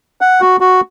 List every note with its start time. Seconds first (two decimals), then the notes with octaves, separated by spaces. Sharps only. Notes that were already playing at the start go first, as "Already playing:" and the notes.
0.21 F#5
0.41 F#4
0.60 F#4